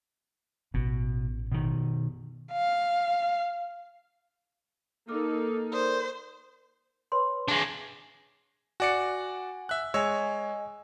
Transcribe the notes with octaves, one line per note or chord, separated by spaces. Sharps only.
A1 B2
B2 D#3
F5
A#3 D#4 A4 D6 F6
A#4 C5 D5 D#6
B4 C#5 B5 C6
G#3 D4
F#4 D5 F#5 G#5 C#7
E5 F#6
G#3 C#5 D#5 G#5 E6